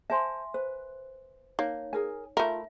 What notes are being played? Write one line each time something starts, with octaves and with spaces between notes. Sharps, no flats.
C5 E5 G#5 A5 C6
B4 C5
A#3 D#4 C#5
G#4 A#4 G#5
A3 F4 A#4 E5 A5 B5